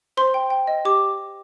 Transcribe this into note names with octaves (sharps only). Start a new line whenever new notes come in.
C5 C6
G5
G5
D#5
G4 D6